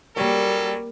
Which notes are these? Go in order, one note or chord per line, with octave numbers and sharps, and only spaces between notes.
F#3 G3 A#3 C#4 A4 A#4